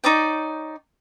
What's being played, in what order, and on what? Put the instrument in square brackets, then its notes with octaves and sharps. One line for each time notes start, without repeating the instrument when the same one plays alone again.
[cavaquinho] D#4 C#5 D5 G5